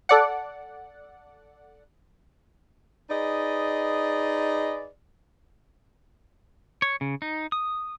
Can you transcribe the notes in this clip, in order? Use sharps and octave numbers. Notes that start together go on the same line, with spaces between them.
A4 D5 F#5
D#4 G#4 B4 D5 D#5
C#5
C#3
D#4
D#6